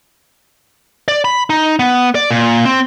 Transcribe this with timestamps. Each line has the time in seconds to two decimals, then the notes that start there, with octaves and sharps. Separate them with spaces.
1.08 D5
1.25 B5
1.50 D#4
1.79 B3
2.15 D5
2.31 A#2
2.65 C4